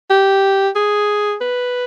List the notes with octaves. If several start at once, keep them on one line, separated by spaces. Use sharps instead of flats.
G4
G#4
B4